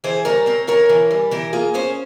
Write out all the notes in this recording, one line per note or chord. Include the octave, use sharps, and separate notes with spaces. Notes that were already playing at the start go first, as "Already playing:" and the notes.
E3 G#4 C5
G3 A#4 C#5
C4 A#4 C#5
E3 A#4 C#5
E3
G3
E3 G4 A#4
A#3 F4 G#4
C#4 G#4 C5